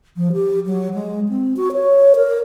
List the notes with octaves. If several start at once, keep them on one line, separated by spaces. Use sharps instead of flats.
F3
G4
F#3
G#3
C4
F#4
C#5
A#4